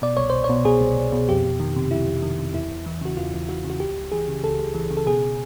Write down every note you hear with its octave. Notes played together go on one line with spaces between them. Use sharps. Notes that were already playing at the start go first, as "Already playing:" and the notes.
B2 D5
C2 C#5
C2 C5
C#5
B2
B2 G#4
C2
C2
B2
F2 G4
F2
D#3
C3
F2 E4
F2
D#3
C3
E2 E4
E2
E3
C#3 F#4
E2 F4
E2
E3 F#4
C#3
F#4
C#2 G4
C#2
E3 G#4
C#3
C#2 A4
C#2
E3
C#3
A4
B2 G#4